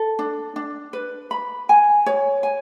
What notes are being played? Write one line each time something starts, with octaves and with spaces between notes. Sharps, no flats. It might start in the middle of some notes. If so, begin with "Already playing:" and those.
Already playing: A4
D4
D4
B4
B5
G#5
C#5
G#5